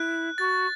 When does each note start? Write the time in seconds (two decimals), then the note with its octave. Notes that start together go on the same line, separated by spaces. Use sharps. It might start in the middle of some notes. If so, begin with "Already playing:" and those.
Already playing: E4 F#6
0.38 F#4 A6